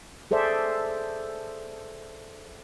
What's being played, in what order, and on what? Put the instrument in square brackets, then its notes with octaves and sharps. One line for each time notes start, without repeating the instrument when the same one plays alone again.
[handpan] G#4 A4 C5 D5 E5